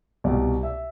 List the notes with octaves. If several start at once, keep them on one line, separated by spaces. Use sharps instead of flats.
C2 B2 G3 D5
E5